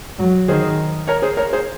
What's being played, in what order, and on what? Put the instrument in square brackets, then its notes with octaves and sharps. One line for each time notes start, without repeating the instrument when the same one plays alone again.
[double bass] F#3
[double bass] D#3 [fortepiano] G#4 C5
[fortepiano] A#4 C#5
G#4 C5
A#4 C#5
G#4 C5